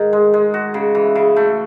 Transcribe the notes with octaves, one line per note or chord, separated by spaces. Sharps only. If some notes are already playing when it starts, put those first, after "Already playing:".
Already playing: G#2 D#3
G#3
G#3
F#4
C#3
E3
C#3
A3